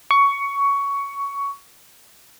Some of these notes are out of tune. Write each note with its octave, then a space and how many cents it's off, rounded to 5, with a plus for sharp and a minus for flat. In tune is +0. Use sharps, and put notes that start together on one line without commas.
C#6 +15